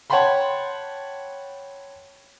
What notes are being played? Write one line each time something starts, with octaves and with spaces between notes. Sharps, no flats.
C#5 F#5 G5 A5 B5 C6